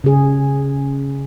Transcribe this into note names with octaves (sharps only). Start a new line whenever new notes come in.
C#3 G#4